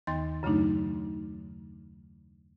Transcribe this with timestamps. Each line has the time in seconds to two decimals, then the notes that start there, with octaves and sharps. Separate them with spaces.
0.07 D#2 D#3 B3 C6 A6
0.43 F#2 C#3 F#3 A3 D4 D#4